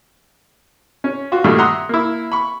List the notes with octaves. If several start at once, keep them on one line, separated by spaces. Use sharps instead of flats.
C#4
F4 F#4
G2 A#2 D#3 A3 F#4
E5 F#5 A#5 C6 D#6
A#3 E4
B5 C#6